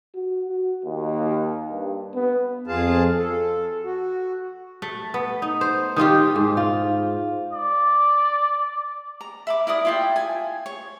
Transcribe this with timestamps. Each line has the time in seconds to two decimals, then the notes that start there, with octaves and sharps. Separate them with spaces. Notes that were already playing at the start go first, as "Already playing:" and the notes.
0.15 F#4
0.49 F#4
0.85 D#2
1.71 G2
2.15 B3
2.67 F2 F4 G#4 F5 A5
3.16 A4
3.84 F#4
4.82 A3
5.14 B3
5.42 D#4
5.61 C5
5.96 D#3 D#4 F4 G4
6.36 G#2
6.57 F4
7.53 D5
9.21 A#5
9.47 E5 B5 D6
9.67 E4 A#4 D5 D#6
9.85 E4 F4 G5
10.16 G#5
10.66 C#5